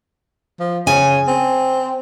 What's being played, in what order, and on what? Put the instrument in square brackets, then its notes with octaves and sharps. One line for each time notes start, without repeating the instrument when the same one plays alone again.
[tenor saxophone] F3
[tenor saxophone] C#3 [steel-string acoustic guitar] G#5
[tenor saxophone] C4